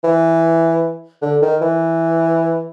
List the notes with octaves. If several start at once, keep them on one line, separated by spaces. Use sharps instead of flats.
E3
D3
D#3
E3